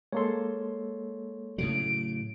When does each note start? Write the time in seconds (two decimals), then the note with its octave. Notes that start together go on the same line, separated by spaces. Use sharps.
0.12 G#3 A#3 A4 C#5 C6
1.58 A2 C#3 F#3 D7